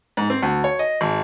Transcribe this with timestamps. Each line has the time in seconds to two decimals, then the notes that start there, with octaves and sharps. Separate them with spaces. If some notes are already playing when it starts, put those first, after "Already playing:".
0.17 G#2
0.30 C4
0.42 D2
0.64 C#5
0.79 D#5
1.01 G#1